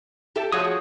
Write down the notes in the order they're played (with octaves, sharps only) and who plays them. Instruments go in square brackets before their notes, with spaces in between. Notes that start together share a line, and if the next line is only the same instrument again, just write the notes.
[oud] G4 A4 E5
[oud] F3 F#4 G#4 [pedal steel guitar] C#5 D#6